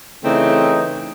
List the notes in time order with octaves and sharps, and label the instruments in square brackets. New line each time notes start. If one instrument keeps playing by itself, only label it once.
[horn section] C#3 E3 A3 C4 D#4